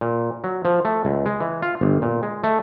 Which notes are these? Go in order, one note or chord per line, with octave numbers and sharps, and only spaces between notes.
A#2
F#3
F3
A3
C#2
G#3
E3
F4
G1
A#2
G#3
A3